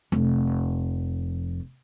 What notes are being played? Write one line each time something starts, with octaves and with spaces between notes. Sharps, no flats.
F1 F2